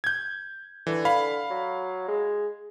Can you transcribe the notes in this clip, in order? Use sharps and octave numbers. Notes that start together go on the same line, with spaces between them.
G6 G#6
D3 E3
F5 B5
F#3
G#3